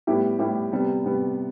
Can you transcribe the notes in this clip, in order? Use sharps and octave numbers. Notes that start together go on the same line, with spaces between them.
A2 G3 B3 E4 G4
A2 G3 B3 E4 G4
C3 G3 B3
C3 G3 B3